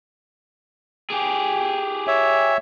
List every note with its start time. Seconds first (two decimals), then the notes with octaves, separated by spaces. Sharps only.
1.10 G4 G#4
2.07 C#5 E5